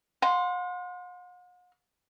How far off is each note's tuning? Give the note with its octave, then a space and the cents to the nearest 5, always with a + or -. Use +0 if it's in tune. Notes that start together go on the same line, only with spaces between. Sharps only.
F#5 -45 C6 +0